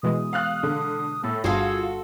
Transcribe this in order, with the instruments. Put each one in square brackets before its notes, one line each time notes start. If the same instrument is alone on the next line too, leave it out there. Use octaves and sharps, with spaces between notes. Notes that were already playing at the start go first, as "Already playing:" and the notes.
[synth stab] B2 E3 G#3 [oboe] D#6
[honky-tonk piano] F5 F6 F#6
D3
[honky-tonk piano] A2 [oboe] A4
[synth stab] G1 G2 C6 [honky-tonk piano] F4 F5 [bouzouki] F#4 A4 [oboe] G#4